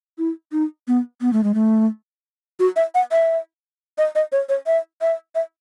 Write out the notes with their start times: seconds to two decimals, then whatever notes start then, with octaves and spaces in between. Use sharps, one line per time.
0.18 E4
0.52 D#4
0.88 B3
1.21 B3
1.33 A3
1.44 G#3
1.54 A3
2.60 F#4
2.76 E5
2.95 F#5
3.12 E5
3.98 D#5
4.15 D#5
4.32 C#5
4.49 C#5
4.67 E5
5.01 E5
5.35 E5